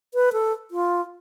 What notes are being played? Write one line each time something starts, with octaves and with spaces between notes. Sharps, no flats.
B4
A4
F4